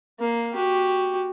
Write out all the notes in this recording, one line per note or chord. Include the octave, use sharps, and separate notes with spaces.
A#3
F#4 G4